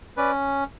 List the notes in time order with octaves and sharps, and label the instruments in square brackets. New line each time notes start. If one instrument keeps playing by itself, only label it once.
[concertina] C#4 B4 D5